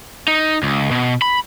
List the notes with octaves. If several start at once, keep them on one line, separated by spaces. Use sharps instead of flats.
D#4
C#2
B2
B5